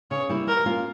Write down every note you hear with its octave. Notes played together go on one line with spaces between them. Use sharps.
C#3 C#5
G3 A#3 E4
G3 A#4
A#3 C#4 F4